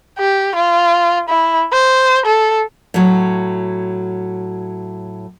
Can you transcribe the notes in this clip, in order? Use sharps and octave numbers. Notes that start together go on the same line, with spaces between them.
G4
F4
E4
C5
A4
A2 F#3